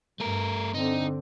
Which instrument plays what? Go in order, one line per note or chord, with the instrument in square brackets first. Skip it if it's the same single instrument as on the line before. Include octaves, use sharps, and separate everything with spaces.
[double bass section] G2 [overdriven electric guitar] A3 A#4
[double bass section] D3 C4 [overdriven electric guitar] D#4